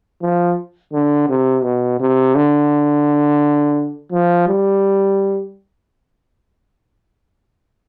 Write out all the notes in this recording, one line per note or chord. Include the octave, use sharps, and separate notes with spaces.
F3
D3
C3
B2
C3
D3
F3
G3